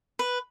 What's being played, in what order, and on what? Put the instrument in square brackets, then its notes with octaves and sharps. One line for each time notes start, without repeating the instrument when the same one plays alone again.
[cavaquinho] B4